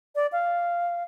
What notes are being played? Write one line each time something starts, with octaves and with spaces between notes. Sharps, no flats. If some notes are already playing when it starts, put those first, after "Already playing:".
D5
F5